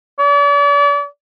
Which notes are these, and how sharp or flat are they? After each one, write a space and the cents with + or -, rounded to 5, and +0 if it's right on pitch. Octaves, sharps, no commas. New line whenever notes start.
D5 -40